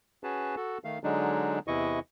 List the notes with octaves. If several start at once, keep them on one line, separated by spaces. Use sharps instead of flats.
C#4 F#4 G#4 B4 A5
F#4 A4
D#3 A3 F5
D3 F#3 G#3 D4 D#4
E2 C3 E3 E4 D#5 C#6